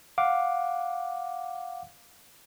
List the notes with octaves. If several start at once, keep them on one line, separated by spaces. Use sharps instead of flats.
F5 F#5 D6